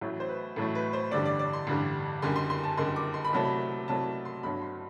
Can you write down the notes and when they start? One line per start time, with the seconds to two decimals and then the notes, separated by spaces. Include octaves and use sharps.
0.01 A1 A2 F#3 A3
0.20 C5
0.29 B4
0.56 A1 A2 F#3 A3 A4
0.75 B4
0.93 C5
1.11 A1 G2 D3 G3 D5
1.25 D5
1.39 D5
1.53 C6
1.67 A1 G2 D3 G3
2.22 F#1 F#2 D3 G3 C6
2.36 C6
2.50 C6
2.63 A5
2.77 F#1 F#2 D3 G3 C6
2.96 D6
3.14 C6
3.24 B5
3.33 C2 C3 F#3 A3 A5
3.45 B5
3.87 C2 C3 F#3 A3 A5
4.25 C6
4.43 G1 G2 F#3 B5
4.62 C6